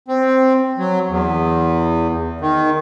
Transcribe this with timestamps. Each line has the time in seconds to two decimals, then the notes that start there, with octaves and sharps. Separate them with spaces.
0.08 C4
0.78 F#3
1.08 E2
2.41 D#3